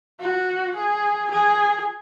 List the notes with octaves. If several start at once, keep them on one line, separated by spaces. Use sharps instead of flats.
F#4
G#4
G#4